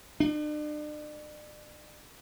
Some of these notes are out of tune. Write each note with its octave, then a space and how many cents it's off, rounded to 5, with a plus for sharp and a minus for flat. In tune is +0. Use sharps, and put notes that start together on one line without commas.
D4 +40